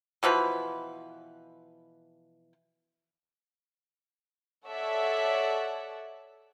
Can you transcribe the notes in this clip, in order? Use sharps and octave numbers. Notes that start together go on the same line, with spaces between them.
B2 E3 F3 B4
A4 C#5 D5 E5 F#5